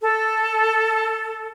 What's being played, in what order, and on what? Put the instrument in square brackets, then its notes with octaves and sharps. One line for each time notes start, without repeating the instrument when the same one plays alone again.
[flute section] A4